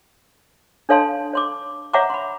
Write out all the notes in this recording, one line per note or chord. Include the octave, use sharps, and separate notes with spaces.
D4 A4 C#5 F5 A5 C6
C#5 C6 D6
C#5 E5 F#5 A#5 C#6 D6
B5 C6